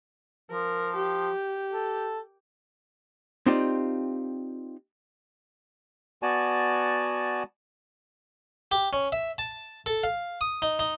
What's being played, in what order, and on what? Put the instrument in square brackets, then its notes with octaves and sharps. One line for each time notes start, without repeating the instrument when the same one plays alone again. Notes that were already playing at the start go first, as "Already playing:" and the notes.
[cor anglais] F3 [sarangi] A#4
[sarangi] G4
[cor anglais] A4
[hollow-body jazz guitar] C4 D#4 F4 G4 D5
[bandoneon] B3 F#4 D5 G#5 A5
[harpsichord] G4
C#4
E5
A5
A4
F5
D#6
D#4
D#4